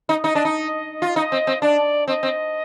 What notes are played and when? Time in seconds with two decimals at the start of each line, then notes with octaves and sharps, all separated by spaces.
0.09 D#4
0.24 D#4 D#5
0.35 D4
0.45 D#4
1.02 F4
1.16 D#4 D#5
1.32 C4
1.47 C4
1.62 D4 D5
2.07 C4 D#5
2.23 C4